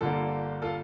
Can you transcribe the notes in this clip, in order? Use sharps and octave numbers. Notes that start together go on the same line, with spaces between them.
G1 G2 D3 G3 A#3 F4 A4
F4 A4